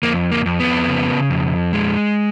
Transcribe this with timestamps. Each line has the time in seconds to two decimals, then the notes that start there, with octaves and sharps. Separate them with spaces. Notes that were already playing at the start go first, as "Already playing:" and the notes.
0.03 F2 A#3
0.32 A#3
0.46 F2
0.60 B3
0.88 C#3
1.30 F2
1.73 G#3